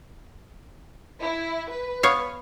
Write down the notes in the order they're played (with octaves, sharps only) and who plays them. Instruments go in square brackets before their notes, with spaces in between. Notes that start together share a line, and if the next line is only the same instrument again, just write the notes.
[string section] E4
B4
[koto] B3 C#5 F5